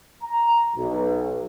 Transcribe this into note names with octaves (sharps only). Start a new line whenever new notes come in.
A#5
B1